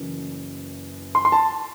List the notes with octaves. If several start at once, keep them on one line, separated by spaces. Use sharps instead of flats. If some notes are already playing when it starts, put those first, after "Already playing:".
Already playing: F#1 F#2 E3
C6
C6
A5